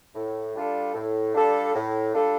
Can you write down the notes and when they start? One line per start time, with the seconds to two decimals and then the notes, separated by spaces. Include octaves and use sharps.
0.15 A2
0.54 G3 D4 F4 A4
0.95 A2
1.34 G3 D4 F4 A4
1.75 A2
2.15 G3 D4 F4 A4